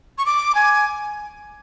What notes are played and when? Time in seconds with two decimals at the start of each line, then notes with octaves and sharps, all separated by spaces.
0.18 C#6
0.26 D6
0.55 G#5